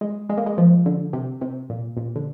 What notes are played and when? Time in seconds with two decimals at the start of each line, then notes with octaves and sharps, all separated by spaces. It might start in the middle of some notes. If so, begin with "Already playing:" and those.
0.01 G#3
0.29 G#3
0.37 A#3
0.46 G#3
0.58 F3
0.86 D3
1.13 C3
1.41 C3
1.70 A#2
1.97 A#2
2.16 D3